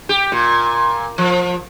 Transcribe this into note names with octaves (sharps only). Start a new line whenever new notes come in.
G4
A#2
F3